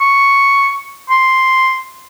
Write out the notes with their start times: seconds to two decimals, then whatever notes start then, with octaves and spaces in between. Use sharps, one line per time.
0.01 C#6
1.10 C6